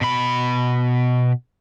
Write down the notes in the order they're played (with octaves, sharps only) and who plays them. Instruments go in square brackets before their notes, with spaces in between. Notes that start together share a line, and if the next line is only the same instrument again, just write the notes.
[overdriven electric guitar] B2 B5